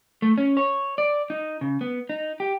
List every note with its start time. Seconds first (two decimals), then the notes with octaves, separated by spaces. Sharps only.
0.22 A3
0.38 C#4
0.57 C#5
0.98 D5
1.30 D#4
1.61 C#3
1.81 B3
2.09 D#4
2.40 G4